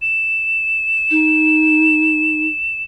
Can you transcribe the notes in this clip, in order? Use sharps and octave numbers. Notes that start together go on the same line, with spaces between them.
E7
D#4